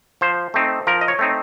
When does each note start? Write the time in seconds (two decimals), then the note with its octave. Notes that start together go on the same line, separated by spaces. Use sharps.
0.21 F3 C5
0.54 A3 C4 D#4
0.87 F3 A#4
1.01 D#5
1.08 C#5
1.19 A3 C4 D#4